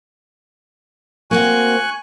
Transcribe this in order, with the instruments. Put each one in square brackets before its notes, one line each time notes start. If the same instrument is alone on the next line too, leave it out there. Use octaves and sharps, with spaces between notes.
[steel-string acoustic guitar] A#3 C4 F#4 [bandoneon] G#5 C#6 F#6